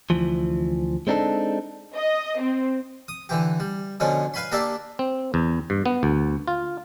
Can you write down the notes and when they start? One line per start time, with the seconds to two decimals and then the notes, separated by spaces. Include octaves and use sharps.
0.10 D2 E3 F3
1.07 G#3 C4 D4 D#4 A4
1.96 D#5
2.42 C4
3.08 D#6
3.29 D3 E3 G4
3.60 G3
4.00 B2 D3 F3 C#4 D4
4.34 B4 F5 G#5 B5 C6
4.52 A#3 D4 G4 A4 D5 E5
4.99 C4
5.34 E2
5.70 G2
5.86 B3
6.03 D2
6.48 F4